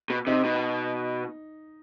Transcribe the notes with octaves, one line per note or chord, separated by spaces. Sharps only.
B2
C3 D#4
B2